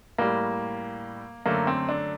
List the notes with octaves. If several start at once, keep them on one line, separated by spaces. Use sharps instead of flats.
A2 G3 A#3
F#2 D3 A3 A#3
C4
D4